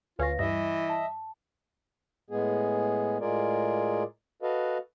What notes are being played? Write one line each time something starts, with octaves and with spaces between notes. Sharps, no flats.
D2 C#4 F4 B4 F5 A#6
G2 E3 D#5 E5 A#6
A5
A2 G#3 B3 G#4
A2 G#3 F4 G#4 A#4 D5
F#4 A4 B4 D#5 F5